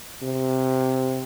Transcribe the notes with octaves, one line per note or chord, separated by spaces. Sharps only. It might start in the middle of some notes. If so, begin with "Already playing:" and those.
C3